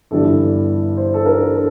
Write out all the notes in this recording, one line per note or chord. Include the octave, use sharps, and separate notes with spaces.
G1 G2 E3 A4
C5
A4
A#4
A4